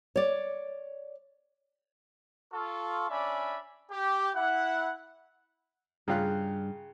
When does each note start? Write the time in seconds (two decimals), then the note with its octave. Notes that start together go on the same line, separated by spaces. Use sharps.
0.16 C#5 D5
2.53 F4 A4 C#6
3.10 C#4 D4 D5 E5 G#5 B5
3.91 G4
4.35 E4 F#5
6.08 G2 C#3 F4 G#4 G5 A#5 F#6